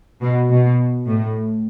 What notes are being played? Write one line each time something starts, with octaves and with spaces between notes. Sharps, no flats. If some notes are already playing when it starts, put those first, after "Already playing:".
B2
B2
A2